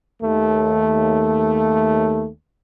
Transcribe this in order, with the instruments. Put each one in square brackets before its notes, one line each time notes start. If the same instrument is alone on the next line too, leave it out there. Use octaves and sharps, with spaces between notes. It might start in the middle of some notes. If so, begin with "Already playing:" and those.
[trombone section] D#2 A3